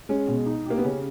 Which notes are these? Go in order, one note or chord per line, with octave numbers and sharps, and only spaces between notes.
G#3 C#4
B2
D#4
A#3 G4
B3
C#3 C#4